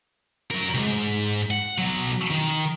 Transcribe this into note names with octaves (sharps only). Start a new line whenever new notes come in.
F#3 A#4
C2 G#2
F#5
B1 F#3
D#3